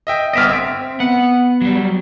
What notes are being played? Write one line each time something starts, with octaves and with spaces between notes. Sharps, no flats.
D#5 E5 G5
G1 B3 D#5 E5 F6 D7
C4 E5 D7
B3 F#5
F#3 G3